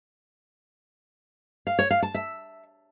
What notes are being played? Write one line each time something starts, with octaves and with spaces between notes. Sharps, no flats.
F5
C#5
F5
A5
E5